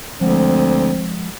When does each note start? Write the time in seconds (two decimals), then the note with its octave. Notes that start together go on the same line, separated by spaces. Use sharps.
0.21 D2 F3 G#3 C4 F#5